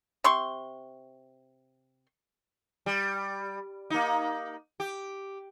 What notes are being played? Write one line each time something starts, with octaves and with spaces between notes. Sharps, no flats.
C3 C6 C#6
G3
A#3 D#4
G4